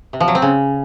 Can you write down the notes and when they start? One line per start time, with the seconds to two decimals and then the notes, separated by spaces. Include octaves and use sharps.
0.13 C3
0.20 F3
0.28 F#3
0.35 C4
0.42 C#3